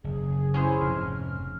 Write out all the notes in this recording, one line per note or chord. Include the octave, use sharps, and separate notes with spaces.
F#1 G#4
C#4 E4 G#4 C5
F1 G#2 F6